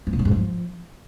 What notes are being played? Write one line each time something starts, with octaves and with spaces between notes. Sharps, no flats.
F#2
B2
F#2
G#2
F3